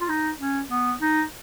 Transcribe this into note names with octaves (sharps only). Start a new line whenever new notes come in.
F4
D#4
C#4
B3
D#4